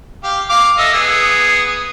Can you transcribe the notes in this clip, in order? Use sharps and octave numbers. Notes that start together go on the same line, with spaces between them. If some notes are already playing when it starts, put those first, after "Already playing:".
G4 F5
F5 D6
A4 D#5 E5
B3 G#4